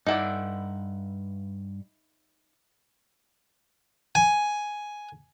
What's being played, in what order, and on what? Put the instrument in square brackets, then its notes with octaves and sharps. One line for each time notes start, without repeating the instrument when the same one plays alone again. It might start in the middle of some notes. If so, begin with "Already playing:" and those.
[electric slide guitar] G2 F#5 [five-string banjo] D#4 E4 D5
[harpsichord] G#5